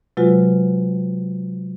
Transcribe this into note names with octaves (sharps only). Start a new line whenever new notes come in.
C3 F#3 G#3 F4 F#4 B4